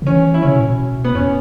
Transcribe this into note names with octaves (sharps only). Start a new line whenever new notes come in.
C#3
E3 C#4
E4
C#3 C#4
B2
A2
B2
B3
E2 C#4